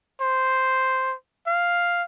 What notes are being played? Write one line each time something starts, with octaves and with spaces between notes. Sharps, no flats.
C5
F5